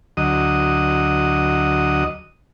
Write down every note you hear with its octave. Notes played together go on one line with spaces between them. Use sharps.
D2 F#3 D#5